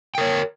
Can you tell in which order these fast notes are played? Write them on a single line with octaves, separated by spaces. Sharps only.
G5 A#4 C#5